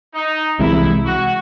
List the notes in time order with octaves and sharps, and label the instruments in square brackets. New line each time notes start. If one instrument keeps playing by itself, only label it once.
[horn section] D#4
[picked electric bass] C2 C3 E3 G#3 [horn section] E4
[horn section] F#4